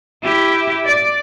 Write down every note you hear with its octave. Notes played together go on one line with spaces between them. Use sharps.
E4 G4
D5